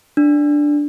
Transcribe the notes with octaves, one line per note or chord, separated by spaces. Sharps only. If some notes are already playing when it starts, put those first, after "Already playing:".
D4